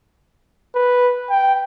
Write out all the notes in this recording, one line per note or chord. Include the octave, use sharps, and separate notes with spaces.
B4
G5